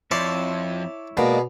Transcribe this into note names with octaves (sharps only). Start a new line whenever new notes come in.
F2 E4 C#5 D5 E5 A5 C6
B2 G#3 A#3 D5